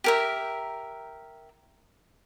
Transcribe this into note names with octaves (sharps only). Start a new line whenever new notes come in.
G4 A#4 E5